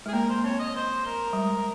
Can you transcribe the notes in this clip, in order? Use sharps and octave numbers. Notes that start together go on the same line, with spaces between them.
G#3 G#4
A#3 A#4
C5
C4 C#5
D#5
C5
A#4
G3
G#3